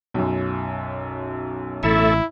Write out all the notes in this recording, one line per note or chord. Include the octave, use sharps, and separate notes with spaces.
B1 F#2
A1 A3 E4 A4 E5